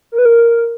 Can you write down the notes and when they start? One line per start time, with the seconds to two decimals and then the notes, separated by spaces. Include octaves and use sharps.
0.12 A#4
0.18 B4
0.25 A#4